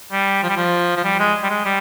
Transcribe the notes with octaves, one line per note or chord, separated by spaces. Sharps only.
G3
F3
G3
F3
F3
G3
G#3
G3
G#3
G3